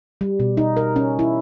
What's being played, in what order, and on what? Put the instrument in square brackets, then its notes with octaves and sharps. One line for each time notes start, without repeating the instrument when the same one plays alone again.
[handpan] G3
B2
D#4
A#4
C#4
E4